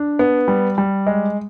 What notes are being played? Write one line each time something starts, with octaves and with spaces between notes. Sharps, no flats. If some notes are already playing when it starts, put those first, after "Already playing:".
Already playing: D4
B3
G3
G3
G#3